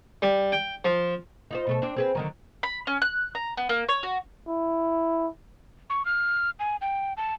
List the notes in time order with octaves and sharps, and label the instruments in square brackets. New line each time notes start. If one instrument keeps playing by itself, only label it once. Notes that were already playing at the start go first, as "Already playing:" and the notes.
[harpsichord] G3
G5
F3
[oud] D#4 F4 C5
B2 A3 A4
C4 D4
C4 G#4 B4
D3 D#3 F#3
[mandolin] B5
C#4
F#6
A#5
B3
A#3
C#5
F#4
[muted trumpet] E4
[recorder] C#6
F6
G#5
G5
A5